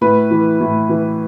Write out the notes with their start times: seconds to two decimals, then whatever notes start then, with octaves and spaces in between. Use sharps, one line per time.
0.01 A2 B4
0.31 E3
0.60 A2
0.89 E3